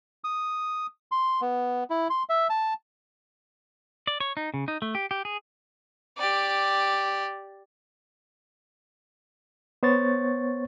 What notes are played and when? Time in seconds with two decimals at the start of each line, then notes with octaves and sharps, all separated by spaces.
0.24 D#6
1.12 C6
1.41 B3
1.90 E4
2.10 C6
2.29 E5
2.50 A5
4.07 D5
4.20 C#5
4.37 D#4
4.54 C#3
4.68 D#4
4.82 A3
4.95 G4
5.11 G4
5.25 G#4
6.18 G4 D5
9.83 B3 C5 C#5 C#6 A6